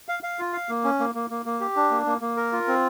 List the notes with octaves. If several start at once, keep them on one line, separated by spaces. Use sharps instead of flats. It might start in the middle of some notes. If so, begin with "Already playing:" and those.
F5
F5
F4
F5
A#3
C#4
A#3
A#3
A#3
A#3
G4
D4
A#3
A#3
A#3
A#4
F4
C4